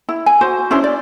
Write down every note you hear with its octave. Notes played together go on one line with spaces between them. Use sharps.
E4
G#5
F#4 C5
C#4 D4 E4 C5
D5